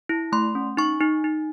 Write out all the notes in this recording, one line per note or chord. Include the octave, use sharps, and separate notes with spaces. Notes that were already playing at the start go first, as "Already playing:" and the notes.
E4
A3 C6
C#4
D#4 C#6
D#4
D#4